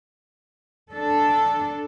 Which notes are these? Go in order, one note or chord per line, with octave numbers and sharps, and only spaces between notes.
D4 A4